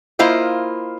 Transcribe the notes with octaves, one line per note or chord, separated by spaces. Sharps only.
A#3 E4 F4 C5 D#5